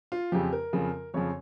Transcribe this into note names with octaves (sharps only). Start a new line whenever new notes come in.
F4
F2 C#3 F3 G4
A#4
F2 C#3 F3
F2 C#3 F3 C#5